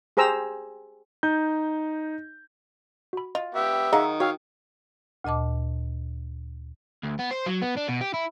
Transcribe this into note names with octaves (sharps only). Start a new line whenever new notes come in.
G4 G#4 C5 A#5 E6
D#4 G6
F#4 B5
F4 D#5
B3 G4 E5
D#3 F#3 D#4 G#4 D#5 F5 F#5
F#4 C#5 F5 G5 E6
D2 A#2 D#5 A5 D6
D2
B3
C5
F#3
B3
D4
B2
G4
E4